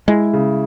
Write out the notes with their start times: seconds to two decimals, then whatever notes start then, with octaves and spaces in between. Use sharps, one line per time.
0.08 G#3 E4
0.33 C#3